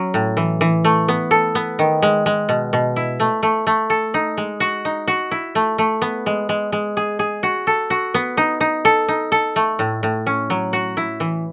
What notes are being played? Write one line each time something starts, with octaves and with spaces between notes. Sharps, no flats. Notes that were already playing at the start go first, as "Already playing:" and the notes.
Already playing: F#3 C#4
A2
E3
E3
A3
B3
A4
B3
D#3
G#3
G#3
B2
B2
E4
A3
A3
A3
A4
D#4
G#3
F#4
D#4
F#4
E4
A3
A3
B3
G#3
G#3
G#3
G#4
G#4
F#4
A4
F#4
B3
D#4
D#4
A4
D#4
A4
A3
A2
A2
C#4
F#3
F#4
E4
E3